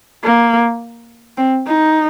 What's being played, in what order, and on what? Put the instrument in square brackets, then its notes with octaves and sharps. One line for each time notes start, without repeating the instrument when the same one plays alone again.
[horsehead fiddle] A#3
C4
D#4